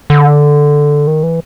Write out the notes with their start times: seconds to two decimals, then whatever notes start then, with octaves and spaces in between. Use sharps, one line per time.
0.10 D3
1.07 D#3
1.23 E3